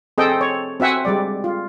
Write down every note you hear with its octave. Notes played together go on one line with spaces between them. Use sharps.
C4 G#4 A4 D#5 G5
C#5
C4 F#4 E5 F#5 G#5
G3 G#3 D5
F4